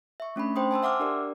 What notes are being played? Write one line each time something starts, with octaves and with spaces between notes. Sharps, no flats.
E5 C#6
A3 C#4 D4 B5
C5 G5 C6 D#6
G#5 A5 C6 E6
E5 F#5 D6 E6 F6
D4 G4 A#4 D5